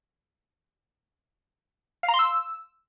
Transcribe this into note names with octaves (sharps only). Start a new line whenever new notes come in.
F5
A#5
C6
E6